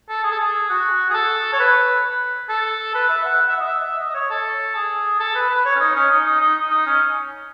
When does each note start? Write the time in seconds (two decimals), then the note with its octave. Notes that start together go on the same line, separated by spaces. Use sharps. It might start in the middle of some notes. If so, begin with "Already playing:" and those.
0.09 A4
0.24 G#4
0.32 A4
0.40 G#4
0.69 F#4
1.10 G#4
1.14 A4
1.53 C#5
1.59 B4
2.49 A4
2.95 B4
3.09 E5
3.25 F#5
3.39 F#5
3.49 E5
3.59 D#5
3.67 E5
3.84 E5
3.99 D#5
4.09 D#5
4.14 C#5
4.30 A4
4.75 G#4
5.20 A4
5.35 B4
5.49 B4
5.65 C#5
5.76 C#4
5.80 D#4
5.95 C#4
6.11 D#4
6.26 D#4
6.41 D#4
6.70 D#4
6.86 C#4